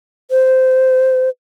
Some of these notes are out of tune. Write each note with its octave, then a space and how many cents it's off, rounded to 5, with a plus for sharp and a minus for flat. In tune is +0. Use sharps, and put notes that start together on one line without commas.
C5 -15